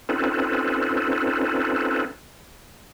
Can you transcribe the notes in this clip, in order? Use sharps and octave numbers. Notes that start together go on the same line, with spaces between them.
C4 C#4 D#4 F4 A4 B4